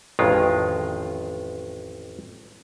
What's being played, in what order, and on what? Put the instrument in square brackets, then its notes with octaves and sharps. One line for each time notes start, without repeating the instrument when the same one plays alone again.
[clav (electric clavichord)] A1 F2 D#3 G#3 F4